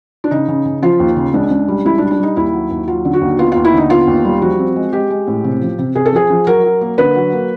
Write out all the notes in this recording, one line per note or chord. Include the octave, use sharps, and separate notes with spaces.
D4
C#3 D#4
C#3
C#3
F3 F4
D#2
C#3
C#2 D4
C#2
G3
C#2 E4
D4
G3
D4
G3 D#4
D#2 E4
F#3
D#2
F#3 F4
D3
F#4
D#2
B3 F4
D#2 F4
E4
D3 D#4
B3 F4
D#2
G3
F3 F#4
C4
G#3
G#3 G4
G#3
A2
C3
F3
C3
C3 G#4
A4
F3 G#4
F3
F#3 A#4
F#3
A#3
D3 B4
F#3
A#3